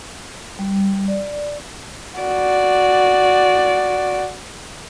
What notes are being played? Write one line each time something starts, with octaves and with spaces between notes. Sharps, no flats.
G3
D5
F#4 D5